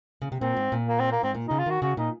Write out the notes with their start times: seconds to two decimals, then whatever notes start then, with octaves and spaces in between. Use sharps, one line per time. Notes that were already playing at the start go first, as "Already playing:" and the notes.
0.22 C#3
0.32 C3
0.41 A#2 C4
0.57 G#2
0.72 A#2
0.88 A#3
1.00 C4
1.12 A#3
1.23 G#2 C4
1.35 A#2
1.47 D#4
1.51 C#3
1.59 F4
1.66 D#3 F#4
1.82 C#3 F#4
1.97 A#2 D#4